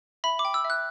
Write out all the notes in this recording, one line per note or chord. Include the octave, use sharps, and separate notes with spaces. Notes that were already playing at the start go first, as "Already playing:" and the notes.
E5 B5
D6
G5
E6
E5
F#6